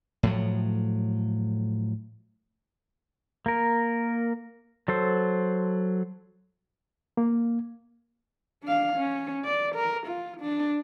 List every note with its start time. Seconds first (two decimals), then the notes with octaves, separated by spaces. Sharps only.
0.23 A2 F3 F#3
3.46 A#3 A#4
4.88 F#3 A4 C5
7.17 A#3
8.63 D4 F5
8.96 C#4
9.45 D5
9.75 A#4
10.07 F4
10.41 D4